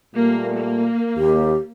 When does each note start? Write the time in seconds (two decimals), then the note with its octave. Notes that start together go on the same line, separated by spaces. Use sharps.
0.15 A#2 G3 A3 A#3
0.58 A#3
1.17 D#2 G4